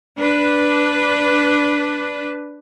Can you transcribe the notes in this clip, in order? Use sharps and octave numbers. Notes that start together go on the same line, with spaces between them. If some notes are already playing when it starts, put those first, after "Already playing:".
D4 B4